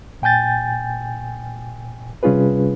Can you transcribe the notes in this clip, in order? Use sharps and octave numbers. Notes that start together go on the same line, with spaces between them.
A#2 G5 G#5 G6 A6
C3 G3 C#4 F4 G#4 B4